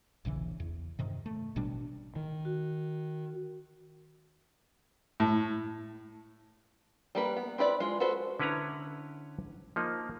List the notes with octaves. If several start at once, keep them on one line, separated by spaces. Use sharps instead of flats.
D#1 A#1 C#3 E3
E2
G2 C3 D#3
A3
A1 B2 G3 D4
D#3
F#4
A2
G3 A#3 B4
B3
C4 E4 B4 D5
G#3 F4
F#4 A4 B4 C5
D3 C#4 E4 B4 C#5 A#5
F3 A#3 D#4